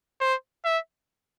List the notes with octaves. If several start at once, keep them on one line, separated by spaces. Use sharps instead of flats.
C5
E5